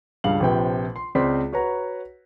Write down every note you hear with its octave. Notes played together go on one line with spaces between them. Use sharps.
C#2 G2 F5 F#7
A#1 C3 F3 B4 G5
C6
C#2 C4 C5 D5 C6 B6
F#4 B4 C#5 F#5 A#5